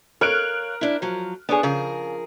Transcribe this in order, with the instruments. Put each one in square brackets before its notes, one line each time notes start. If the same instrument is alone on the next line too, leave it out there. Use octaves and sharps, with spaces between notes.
[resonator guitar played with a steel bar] A#4 [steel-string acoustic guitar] C#5 F5 [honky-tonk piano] F6 F#6 D7
[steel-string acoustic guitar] D4 E4
F3 F#3
[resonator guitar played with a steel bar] B3 G#4 [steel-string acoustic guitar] D4 C#5
[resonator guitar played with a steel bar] C#3 [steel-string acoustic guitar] F3 G#4 A#4